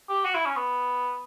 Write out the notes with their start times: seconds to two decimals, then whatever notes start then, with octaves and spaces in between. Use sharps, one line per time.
0.09 G4
0.25 F#4
0.35 E4
0.46 C#4
0.56 B3